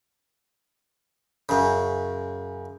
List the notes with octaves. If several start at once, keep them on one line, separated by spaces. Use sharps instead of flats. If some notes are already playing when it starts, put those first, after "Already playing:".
F#2 C#3